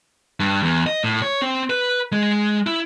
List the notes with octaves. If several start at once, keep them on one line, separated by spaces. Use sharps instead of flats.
G2
E2
D#5
A2
C#5
C4
B4
G#3
E4